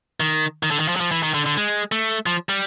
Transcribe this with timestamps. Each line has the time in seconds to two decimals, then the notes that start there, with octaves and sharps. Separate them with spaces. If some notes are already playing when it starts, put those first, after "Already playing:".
0.20 D#3
0.63 D#3
0.71 D3
0.80 D#3
0.88 F3
0.96 F#3
1.00 F3
1.11 E3
1.23 D#3
1.34 D3
1.46 D3
1.57 G#3
1.92 A3
2.26 F3
2.49 G3